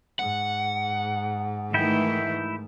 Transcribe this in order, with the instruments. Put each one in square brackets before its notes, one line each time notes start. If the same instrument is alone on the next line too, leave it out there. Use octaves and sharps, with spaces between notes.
[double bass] G#2 [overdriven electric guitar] F#5
[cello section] D#3 E3 A3 [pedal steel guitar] E4 G5